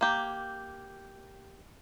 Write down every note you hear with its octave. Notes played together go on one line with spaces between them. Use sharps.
A#3 G4